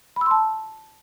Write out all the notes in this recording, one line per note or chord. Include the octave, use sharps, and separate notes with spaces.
A5 B5 C6 E6